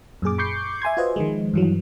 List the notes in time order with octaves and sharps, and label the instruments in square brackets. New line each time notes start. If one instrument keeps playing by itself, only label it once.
[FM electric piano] F#2 A#2 G#4 D6
B5 C#6 D6 G6 C7 C#7
E5 G#5 C6 G#6
F4 F#4 B4 C5 D#5
D#3 F3 G#3
G2 E3 F#3